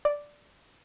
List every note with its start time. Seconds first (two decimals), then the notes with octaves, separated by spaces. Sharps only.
0.05 D5